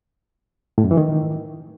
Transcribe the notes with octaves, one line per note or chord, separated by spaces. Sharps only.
A2
F#2
E3
D#3